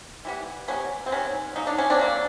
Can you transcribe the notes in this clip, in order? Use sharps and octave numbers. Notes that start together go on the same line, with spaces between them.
E3 G3 B3
C3 D#3 G3 B3 C#4
C4
C3 D#3 G3 B3 C#4
C#3 F#3 A#3 D#4
D4
C#4
C4 D4
C#3 F#3 A#3